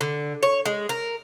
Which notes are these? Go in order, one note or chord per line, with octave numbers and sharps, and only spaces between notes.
D3
C#5
G#3
A#4